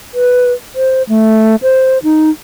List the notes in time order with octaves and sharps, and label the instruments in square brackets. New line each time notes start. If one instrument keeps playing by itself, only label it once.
[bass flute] B4
C5
A3
C5
D#4